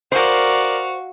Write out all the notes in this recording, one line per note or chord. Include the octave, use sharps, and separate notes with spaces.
F#4 A#4 C5 D5 F5